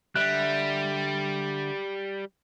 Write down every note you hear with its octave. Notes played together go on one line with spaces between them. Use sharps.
D3 G3 E5 F#6